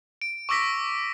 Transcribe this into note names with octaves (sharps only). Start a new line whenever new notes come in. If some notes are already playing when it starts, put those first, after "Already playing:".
D7
C#6 D6 E6 A#6 B6